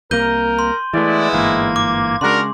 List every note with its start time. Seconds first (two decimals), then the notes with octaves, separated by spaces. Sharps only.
0.11 C2 C3 A#3 A#4 G6 D#7 G7
0.59 C6
0.93 E3 G#3 A3 B3 E4 D5
1.33 G1 G#2 E3 A#3 G#6
1.76 D6
2.21 C#3 G#3 D4 F#4 A#4 C6